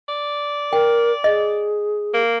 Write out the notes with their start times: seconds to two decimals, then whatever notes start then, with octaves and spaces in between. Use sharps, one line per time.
0.09 D5
0.73 A#4 G5
1.24 G#4 D#5
2.14 A#3